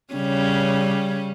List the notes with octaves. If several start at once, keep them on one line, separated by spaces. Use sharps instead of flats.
C#3 G3 C#4